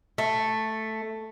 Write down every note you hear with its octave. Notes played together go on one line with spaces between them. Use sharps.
A3